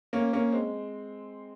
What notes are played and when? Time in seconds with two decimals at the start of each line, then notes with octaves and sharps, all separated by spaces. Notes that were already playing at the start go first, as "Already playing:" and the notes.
0.13 A#3 C#4
0.33 A#3 C#4
0.52 G#3 C4